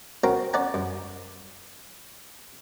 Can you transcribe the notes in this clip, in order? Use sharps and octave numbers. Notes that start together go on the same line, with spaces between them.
C4 C#4 F#4 A#4 A#5
C#4 D5 F#5 G#5 A#5
F#2